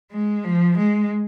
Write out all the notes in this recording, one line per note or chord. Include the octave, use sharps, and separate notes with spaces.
G#3
F3
G#3